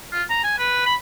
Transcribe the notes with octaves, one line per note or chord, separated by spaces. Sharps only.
F4
A#5
G#5
B4
B5